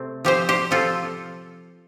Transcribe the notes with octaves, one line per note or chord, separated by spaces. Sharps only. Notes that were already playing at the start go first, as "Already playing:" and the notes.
Already playing: C3 A3 C4
F3 C4 G4 C5
G4 C5
F3 C4 F4 A4